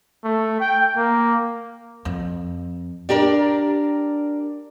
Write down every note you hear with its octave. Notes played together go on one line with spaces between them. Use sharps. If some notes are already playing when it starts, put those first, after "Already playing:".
A3
G5
A#3
F2
D4 G4 A#4 D5